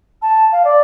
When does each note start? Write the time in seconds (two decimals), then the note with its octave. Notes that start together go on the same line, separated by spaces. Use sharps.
0.22 A5
0.52 F5
0.65 D5